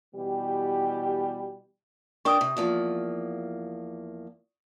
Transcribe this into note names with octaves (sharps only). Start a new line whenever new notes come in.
B2 E3 G3 G4
D4 A#4 G5 C#6 D#6
C3
E2 F3 A#3